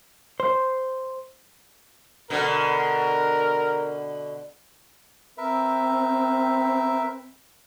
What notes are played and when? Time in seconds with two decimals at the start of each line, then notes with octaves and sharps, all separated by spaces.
0.40 C5
2.30 B2 D3 A#4
5.37 C4 A#4 B4 E5